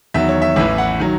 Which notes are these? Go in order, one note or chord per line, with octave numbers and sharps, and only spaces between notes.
E2 D#3 F#3 E5
C#5
E5
A1 A2 E3 E5
F#5
D#3 F#3